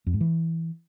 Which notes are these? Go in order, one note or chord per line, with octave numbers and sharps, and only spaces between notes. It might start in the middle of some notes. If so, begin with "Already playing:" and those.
F2
G#2
E3